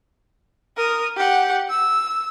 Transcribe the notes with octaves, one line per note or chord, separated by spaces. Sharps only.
A#4 D#6
G4 F#5
E6